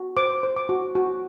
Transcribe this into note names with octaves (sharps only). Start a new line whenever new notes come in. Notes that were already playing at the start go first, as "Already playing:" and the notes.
Already playing: F#4
C5 D6
C5
D6
F#4
F#4